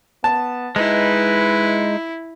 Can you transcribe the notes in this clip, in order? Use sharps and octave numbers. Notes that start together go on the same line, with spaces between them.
B3 A5
G#3 D#4 E4 B4